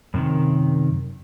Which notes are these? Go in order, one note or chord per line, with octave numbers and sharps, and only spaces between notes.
F#2 C3 D#3